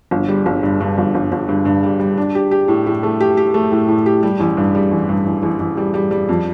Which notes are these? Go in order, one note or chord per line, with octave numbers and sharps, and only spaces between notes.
G1
G3
G1
G2
G2
G1
G1
G1
G2
G2
G3
G3
D4
G4
G4
A2
A2
A3
G4
G4
A3
A2
A2
G4
G3
A1
G2
G3
A1
G2
A1
A1
A1
G3
G3
G3
F2